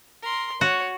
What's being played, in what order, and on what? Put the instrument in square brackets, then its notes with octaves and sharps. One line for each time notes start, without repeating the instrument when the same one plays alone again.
[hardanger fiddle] A#4 C6
[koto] F#4 [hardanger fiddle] C#5